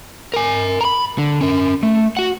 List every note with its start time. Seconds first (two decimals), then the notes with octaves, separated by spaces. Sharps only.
0.34 A#4 G#5
0.81 A#5 B5
1.18 D3
1.41 C#4 A#4
1.83 A3
2.17 F#4 F#5